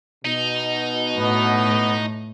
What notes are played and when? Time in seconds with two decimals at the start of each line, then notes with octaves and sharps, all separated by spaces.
0.25 B2 D#4
1.17 A2 B3